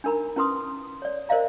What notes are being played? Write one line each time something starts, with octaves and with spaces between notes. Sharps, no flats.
D4 D#4 A#4 A#5 B5
C#4 E4 B4 C6 D#6
C#5 D5
A#4 C5 D5 D#5 F5 A#5